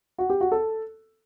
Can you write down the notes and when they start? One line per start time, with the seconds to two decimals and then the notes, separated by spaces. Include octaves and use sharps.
0.18 F#4
0.30 G4
0.41 F#4
0.52 A4